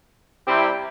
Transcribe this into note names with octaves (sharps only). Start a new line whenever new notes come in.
C3 G3 C4 E4 G4